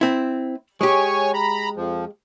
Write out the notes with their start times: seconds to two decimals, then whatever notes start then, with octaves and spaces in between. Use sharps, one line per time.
0.01 C4 E4
0.81 G#3 G4 C#5 G#5 C#6
1.34 A#5 B5
1.77 F2 F3